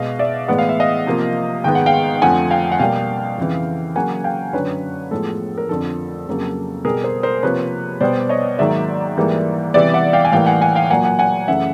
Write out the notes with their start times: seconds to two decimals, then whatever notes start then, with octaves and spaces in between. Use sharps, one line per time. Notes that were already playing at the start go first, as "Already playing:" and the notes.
Already playing: B2 G#3 B3 D#5 F5
0.19 D5 E5
0.48 A2 E3 G#3 B3 F#5
0.58 F5
0.69 E5
0.80 D#5 F5
1.07 C3 F3 A#3
1.64 G#2 D#3 G#3 B3 G5
1.75 F#5
1.86 F5 G5
2.22 F2 D3 F3 A3 F#5 G#5
2.51 F5 G5
2.72 F#5
2.79 B2 G3 A#3 F5 G5
3.38 F2 C#3 E3
3.96 C#3 F#3 A#3 F#5 G#5
4.24 F5 G5
4.53 F#2 D3 F#3 B4 C#5
5.11 A2 F3 G#3 B3 A4
5.58 A#4
5.69 F2 D3 F3 A4
6.27 F2 C#3 F#3 A#3
6.85 B2 G3 B3 G#4 A#4
7.04 A#4 C5
7.23 A#4 C5
7.43 C3 F3 A#3 B4 C#5
8.00 B2 G3 B3 C5 D5
8.29 C#5 D#5
8.58 G#2 D#3 F#3 A#3 D5 E5
9.17 G#2 E3 G3 A#3
9.74 C3 E3 G3 B3 D5 E5
9.94 E5 F#5
10.13 F5 G5
10.25 G#5
10.32 A2 E3 G3 A#3 F5 G5
10.46 F#5 G#5
10.62 F#5 G#5
10.75 F5 G5
10.90 A#2 F#3 A#3 F#5 G#5
11.05 F#5 G#5
11.19 F#5 G#5
11.48 F#2 C#3 E3 A3 E5 F#5